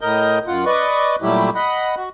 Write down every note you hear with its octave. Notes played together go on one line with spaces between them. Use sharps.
A2 A#4 D#5 G6
F#2 F4 F#5
B4 D5 D#5 C#6
A#2 F#3 G3 A3 E4 G4
D#5 F#5 B5
F#4